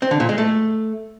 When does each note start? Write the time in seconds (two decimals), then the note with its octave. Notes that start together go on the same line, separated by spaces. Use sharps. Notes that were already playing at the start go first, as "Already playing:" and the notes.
0.02 C4
0.11 D3
0.20 A#2
0.29 G#3
0.38 A3